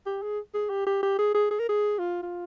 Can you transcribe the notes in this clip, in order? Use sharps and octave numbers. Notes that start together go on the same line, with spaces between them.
G4
G#4
G#4
G4
G4
G4
G#4
G#4
G#4
A#4
G#4
F4
F4